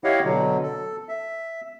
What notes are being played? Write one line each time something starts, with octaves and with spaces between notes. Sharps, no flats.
E4 G4 C#5 D#5 F5 F#5
B2 D3 F#3
A4
E5